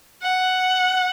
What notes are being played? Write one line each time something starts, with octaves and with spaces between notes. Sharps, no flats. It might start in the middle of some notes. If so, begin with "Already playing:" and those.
F#5